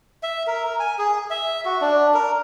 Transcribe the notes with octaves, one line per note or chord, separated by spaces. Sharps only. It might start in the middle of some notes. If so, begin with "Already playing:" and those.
E5
A#4
A#4
G#5
G#4
E5
F#4
D4
A#4